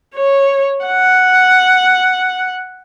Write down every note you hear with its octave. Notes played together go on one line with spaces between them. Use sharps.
C#5
F#5